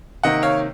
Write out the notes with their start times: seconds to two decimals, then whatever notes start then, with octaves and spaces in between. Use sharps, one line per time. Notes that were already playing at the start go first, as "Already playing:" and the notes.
0.23 C3 D#3 A#3 D#5 F#5
0.43 C#5 F5